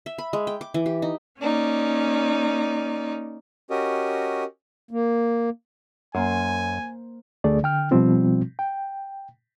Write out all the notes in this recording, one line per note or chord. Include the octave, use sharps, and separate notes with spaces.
E5
B5
G#3
G5
D6
E3
G4
D#4
A#3 C#4 D#4 D5
C#4 F#4 G4 A#4 D#5
A#3
F#2 A#3 C5 G#5
D2 D3 A3 G#4 D5
D3 G5 F6
B2 F3 G3 C4 F4
G5